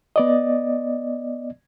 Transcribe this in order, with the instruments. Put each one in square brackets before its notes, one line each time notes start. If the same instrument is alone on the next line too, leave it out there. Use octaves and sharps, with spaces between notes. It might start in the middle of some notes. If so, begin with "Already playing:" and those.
[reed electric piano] B3 D5 D#5